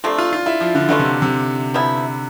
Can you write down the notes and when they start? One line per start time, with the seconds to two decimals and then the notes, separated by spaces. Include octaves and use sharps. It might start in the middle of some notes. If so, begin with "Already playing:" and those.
0.04 C3 F3 A3 D4
0.18 F4
0.33 F4
0.46 E4
0.60 F3
0.75 D3
0.88 B2 D3 A3 D4 F4
0.99 C3
1.22 C3
1.74 F3 B3 E4